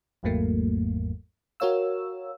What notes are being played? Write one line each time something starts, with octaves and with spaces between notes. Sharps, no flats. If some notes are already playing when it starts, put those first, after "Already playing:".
G#1 E2 G#2 F#3 A3 A#3
F#4 A#4 C#5 F5 E6